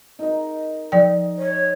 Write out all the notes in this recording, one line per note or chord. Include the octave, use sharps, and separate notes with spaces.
D#4 A#4 D#5
F3 D#4 D5 G5
C#5